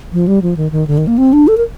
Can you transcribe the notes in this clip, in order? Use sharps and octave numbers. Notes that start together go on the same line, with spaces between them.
F3
G3
F3
D#3
D#3
D3
D#3
A#3
C4
D4
A4
A#4